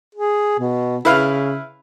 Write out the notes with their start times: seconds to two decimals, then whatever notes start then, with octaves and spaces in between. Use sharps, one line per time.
0.15 G#4
0.59 B2
1.05 C#3 E4 B4 F5